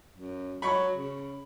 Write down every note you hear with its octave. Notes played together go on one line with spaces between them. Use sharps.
F#2
F#3 B5 C#6
C#3